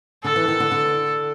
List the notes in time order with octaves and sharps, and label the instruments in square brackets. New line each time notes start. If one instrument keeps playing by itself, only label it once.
[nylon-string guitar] D3 [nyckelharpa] A4
[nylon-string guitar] E3
D#3
D3
D3